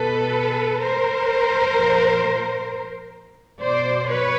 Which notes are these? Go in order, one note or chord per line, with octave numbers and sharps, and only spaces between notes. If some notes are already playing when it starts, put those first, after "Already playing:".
Already playing: B2 A4 B4
A#4 C5
A#2 F3
B2 C5 D5
B4 C#5